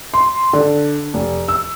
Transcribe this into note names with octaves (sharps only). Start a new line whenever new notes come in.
C6
D3
F1
E6